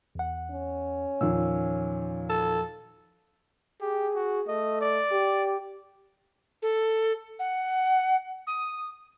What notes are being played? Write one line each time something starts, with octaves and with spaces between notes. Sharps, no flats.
E2 F#5
C#4
E2 A#2 D#3 F3 E6
A4
G4 G#4
F#4
A3 D#5
D5
G4
A4
F#5
D#6